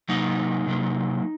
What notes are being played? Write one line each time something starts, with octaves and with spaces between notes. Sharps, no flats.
C3 F#3 A#3 D#4
C3 F#3 A#3